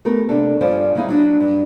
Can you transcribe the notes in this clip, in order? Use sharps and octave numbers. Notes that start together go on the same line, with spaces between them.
A3 B3 G4 A#4
C3 A#3 D4 A4
G2 F3 C#4 C5 D5
F#3 G3 A#3 D#4 E4 G#4
F#3 D4
G2